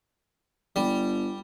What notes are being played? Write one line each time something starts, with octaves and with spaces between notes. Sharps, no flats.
G1 G3